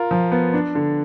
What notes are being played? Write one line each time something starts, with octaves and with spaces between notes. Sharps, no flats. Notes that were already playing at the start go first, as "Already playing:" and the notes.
Already playing: F4 A#4
F3
B3
D4
D3